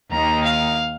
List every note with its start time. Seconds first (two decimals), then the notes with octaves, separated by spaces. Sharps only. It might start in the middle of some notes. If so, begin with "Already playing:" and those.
0.10 D#2 D#3 A#3 D#4 A#5
0.43 F5